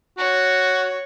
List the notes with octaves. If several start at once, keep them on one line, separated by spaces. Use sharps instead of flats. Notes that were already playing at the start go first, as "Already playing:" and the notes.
F#4 C#5